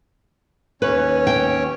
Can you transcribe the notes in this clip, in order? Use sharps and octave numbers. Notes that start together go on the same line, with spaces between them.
D#2 C#4 B4 C#5
G5